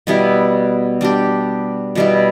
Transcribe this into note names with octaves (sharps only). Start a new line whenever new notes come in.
B2 G3 B3 E4
G3 D4 G4
B2 G3 B3 E4